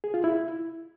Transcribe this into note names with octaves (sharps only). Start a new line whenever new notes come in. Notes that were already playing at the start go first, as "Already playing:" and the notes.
G#4
F4
E4